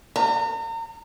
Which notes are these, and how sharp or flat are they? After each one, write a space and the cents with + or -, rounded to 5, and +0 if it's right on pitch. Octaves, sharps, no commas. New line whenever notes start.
A#5 -35